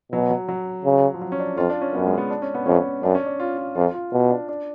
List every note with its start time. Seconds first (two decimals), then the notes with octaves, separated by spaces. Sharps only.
0.12 B2 F#3
0.30 F#3
0.48 F#3
0.85 C#3
1.14 F3
1.22 F#3
1.32 C#4
1.39 D4
1.57 F2 F4
1.70 D4
1.81 C#4
1.94 F#2 B3
2.06 G#3
2.18 B3
2.30 D4
2.42 C#4
2.55 B3
2.66 F2 C#4
3.03 F#2 D4
3.15 C#4
3.26 D4
3.40 F4
3.58 F4
3.76 F2 F4
3.94 F4
4.12 B2
4.30 D4
4.48 D4